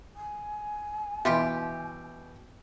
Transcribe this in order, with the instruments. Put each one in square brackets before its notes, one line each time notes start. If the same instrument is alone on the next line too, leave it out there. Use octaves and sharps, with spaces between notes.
[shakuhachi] G#5
[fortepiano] B2 E3 [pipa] G3 F4 G4 [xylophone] E5